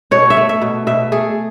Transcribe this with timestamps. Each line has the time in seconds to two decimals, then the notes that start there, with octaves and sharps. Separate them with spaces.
0.11 B2 C#5
0.30 E5
0.37 A3
0.49 E5
0.62 B2
0.87 B2 E5
1.12 A3 G#4